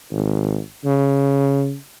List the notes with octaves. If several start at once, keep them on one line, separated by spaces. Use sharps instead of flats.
G#1
C#3